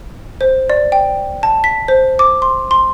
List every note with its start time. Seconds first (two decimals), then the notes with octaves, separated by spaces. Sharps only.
0.41 C5
0.70 D5
0.92 G5
1.43 A5
1.64 B6
1.88 C5
2.19 D6
2.42 C6
2.71 C6